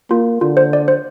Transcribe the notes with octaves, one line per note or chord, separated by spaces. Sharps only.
A#3 F4
D3 F4
C5
D5
C5